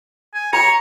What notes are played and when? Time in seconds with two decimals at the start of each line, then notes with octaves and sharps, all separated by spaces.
0.34 G#5
0.53 C#5 A#5